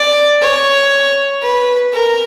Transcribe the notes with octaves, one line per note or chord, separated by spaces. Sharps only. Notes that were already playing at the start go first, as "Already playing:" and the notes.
Already playing: D5
C#5
B4
A#4